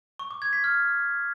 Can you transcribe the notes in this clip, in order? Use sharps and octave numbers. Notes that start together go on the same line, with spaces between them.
C#6
D6
G#6
B6
F6